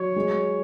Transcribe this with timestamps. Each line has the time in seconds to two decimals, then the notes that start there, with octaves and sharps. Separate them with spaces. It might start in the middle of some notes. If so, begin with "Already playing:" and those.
Already playing: F#3 C#5
0.16 G#3